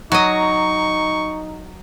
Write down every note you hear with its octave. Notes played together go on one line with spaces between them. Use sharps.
F#3 D#4 D#5 C#6